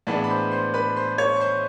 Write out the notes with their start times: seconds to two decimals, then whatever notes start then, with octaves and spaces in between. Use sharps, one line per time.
0.07 A2 E3 G#3 B3 D4 D5 D6
0.24 B5
0.30 C5 C6
0.51 C5 C6
0.74 B4 B5
0.96 C5 C6
1.18 C#5 C#6
1.36 C#6
1.41 C5 C6